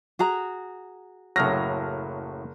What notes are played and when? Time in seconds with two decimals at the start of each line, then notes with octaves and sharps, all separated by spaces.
0.19 F#4 G#4 A#5
1.36 F#1 A2 C#3 F#3 F6 A#6